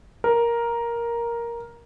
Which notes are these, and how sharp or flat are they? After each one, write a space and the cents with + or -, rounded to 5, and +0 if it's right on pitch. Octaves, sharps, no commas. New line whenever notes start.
A#4 +5